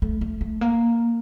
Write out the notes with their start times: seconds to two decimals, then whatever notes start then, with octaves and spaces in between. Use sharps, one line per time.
0.02 A3
0.21 A3
0.41 A3
0.61 A#3